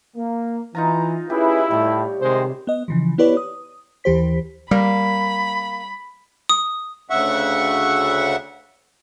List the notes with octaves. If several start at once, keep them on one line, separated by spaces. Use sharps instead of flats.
A#3
E3 D#4 F4 A#5
C#4 E4 G4 G#4 B4
A2 G3 C#5
C3 D#3 G#3 C5
B3 D#5
C#3 E3 F3
B3 E4 G4 B4 C#5 D5
D#6
D#2 E3 G4 C5 B6
G3 A#3 B5
D#6
D2 C#3 E5 F#5 C#6